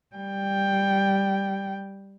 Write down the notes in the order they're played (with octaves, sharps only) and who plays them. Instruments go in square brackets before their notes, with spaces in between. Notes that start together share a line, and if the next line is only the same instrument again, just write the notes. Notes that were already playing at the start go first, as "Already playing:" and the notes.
[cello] G3 G5